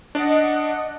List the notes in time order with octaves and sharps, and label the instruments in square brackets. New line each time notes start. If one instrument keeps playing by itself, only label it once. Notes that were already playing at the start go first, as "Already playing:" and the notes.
[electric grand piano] D4 D5 [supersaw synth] D#5 F#5